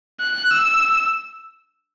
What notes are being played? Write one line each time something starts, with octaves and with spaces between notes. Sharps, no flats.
F#6
E6